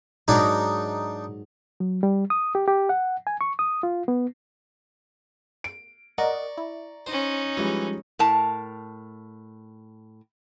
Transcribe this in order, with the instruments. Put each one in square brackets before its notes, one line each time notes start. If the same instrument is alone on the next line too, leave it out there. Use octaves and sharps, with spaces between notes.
[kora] G#2 F#3 A#4 [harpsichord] D4 D#4
[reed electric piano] F#3
G3
D#6
G4
G4
F#5
G#5
C#6
D#6
F4
B3
[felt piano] D7
[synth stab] A#4 D#5 F#5 [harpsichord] D5 C#6 [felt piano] A#5
[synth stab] E4
[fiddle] C#4 D#4 [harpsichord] C5
[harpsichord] E3 [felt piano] F3 G3 G#3
[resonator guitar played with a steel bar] A2 A#4 A5